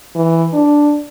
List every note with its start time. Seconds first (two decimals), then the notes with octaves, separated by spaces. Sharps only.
0.15 E3
0.53 D4